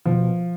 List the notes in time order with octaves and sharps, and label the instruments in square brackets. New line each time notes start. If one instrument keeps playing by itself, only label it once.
[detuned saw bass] B2 [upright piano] F3